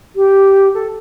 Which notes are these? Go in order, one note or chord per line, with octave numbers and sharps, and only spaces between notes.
G4
A4